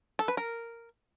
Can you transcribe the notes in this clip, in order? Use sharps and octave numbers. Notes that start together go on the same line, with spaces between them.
A4
B4
A#4